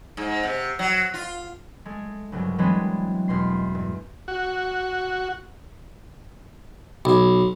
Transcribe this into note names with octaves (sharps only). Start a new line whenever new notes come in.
G#2
C3
F#3
F4
G#3 A3
C2 G2 C#3 F#3
E3 F#3 G#3 B3 C4 D4
E2 B2 C6 C7
G2
F#4
B1